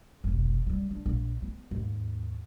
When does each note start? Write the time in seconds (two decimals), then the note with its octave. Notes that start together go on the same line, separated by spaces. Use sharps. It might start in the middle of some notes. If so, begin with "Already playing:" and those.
0.24 F1 B1
0.66 C#3 G3
0.91 D3
1.06 A#1
1.42 B3
1.71 D#2 G#2